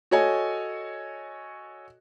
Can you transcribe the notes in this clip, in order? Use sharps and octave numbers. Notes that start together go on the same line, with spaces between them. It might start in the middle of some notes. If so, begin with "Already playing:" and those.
F#4 A4 C#5 D#5 G#5